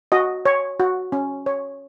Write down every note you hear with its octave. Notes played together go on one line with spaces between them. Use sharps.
F#4 D#5
C#5
F#4
C#4
C#5